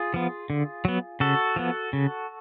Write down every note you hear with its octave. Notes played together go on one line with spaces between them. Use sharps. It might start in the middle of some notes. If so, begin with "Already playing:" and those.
Already playing: F4 G#4
F3 B3
D3
F#3 B3
C#3 F#4 A4
F3 B3
C#3